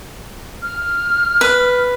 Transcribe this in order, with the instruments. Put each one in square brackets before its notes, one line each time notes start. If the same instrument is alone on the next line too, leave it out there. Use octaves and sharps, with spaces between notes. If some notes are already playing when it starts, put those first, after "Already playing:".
[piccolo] F6
[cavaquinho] B4